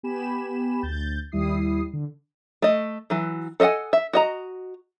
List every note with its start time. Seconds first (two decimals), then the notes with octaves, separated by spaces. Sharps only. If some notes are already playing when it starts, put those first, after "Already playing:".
0.03 B3 G4 G#5 B5 E7
0.83 D2 G6 A6
1.31 D#2 G3 E4 D#6 C7
1.93 D3
2.62 A3 D#5
3.10 E3 F#3
3.60 A4 D#5 E5 F#5 G#5
3.93 E5
4.13 F#4 D#5 A#5